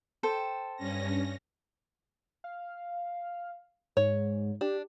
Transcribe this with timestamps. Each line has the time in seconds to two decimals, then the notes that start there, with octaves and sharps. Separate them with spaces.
0.23 A4 C5 G5
0.77 G2 C#4 A#6
2.44 F5
3.97 G#2 C#5
4.61 D4 G4